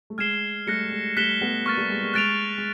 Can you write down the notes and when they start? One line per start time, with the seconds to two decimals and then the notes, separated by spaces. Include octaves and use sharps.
0.10 A3
0.18 G#3 F6 G#6 C7 E7 G7
0.67 G3 A3 F#6 A#6 C#7
0.92 G#3
1.16 G3 A3 F#6 B6 E7 G7
1.41 A3 B3
1.66 A#3 C#6 F6 A6
1.77 G3 A3
1.90 G#3
2.01 G#3
2.14 G#3 F#6 A6 D7 F7
2.58 G#3